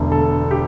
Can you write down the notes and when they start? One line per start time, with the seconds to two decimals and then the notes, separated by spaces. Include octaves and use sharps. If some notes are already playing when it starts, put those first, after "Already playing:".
Already playing: E1 E2 D3 A3
0.12 A4
0.51 G4